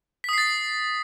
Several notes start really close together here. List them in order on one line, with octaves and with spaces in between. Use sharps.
B6 D#6 C7 A6